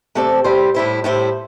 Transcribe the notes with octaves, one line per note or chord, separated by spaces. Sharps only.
C3 A3 C4 A4 D5
A2 G3 E4 C5
A2 G3 E4 C5
A2 G3 E4 C5